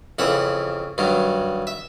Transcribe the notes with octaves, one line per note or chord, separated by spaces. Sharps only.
F2 C#3 E3 E5 F#5
G2 D#3 F#3
E5